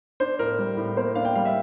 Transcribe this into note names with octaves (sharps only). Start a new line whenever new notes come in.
D4 C5
A2 A#4
G3
A2
A#3 C5
D4 F5
G5
G3 F5
E5